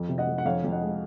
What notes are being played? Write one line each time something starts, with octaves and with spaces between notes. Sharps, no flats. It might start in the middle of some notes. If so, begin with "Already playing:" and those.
Already playing: F2
C3
D#5 F#5
F2
F#5
F2 C#5 F5
F2
D#5 F#5
G#3